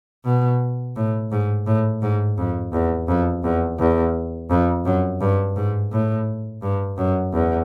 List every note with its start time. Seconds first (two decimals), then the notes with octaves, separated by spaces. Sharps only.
0.25 B2
0.96 A2
1.32 G#2
1.67 A2
2.02 G#2
2.38 F2
2.73 E2
3.08 F2
3.44 E2
3.79 E2
4.50 F2
4.85 F#2
5.21 G2
5.56 G#2
5.92 A2
6.62 G2
6.98 F#2
7.33 E2